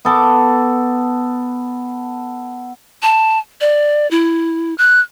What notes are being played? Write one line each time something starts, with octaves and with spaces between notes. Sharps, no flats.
B3 A4 D6
A5
D5
E4
F#6